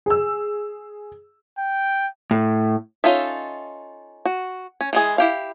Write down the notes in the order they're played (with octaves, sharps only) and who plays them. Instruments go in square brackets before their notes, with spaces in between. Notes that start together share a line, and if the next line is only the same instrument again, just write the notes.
[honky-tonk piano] G#4 E6
[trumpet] G5
[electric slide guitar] A2
[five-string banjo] C#4 D#4 F4 A4 E5
F#4
C#4
E3 G#3 G#4
E4 G4 F5